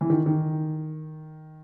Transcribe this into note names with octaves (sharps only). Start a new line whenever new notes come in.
E3
D#3
D#3